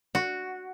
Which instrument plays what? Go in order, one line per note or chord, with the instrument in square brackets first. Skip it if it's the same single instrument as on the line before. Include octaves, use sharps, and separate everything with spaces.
[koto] F#4